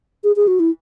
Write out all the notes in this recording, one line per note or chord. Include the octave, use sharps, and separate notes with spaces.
G#4
G#4
F#4
E4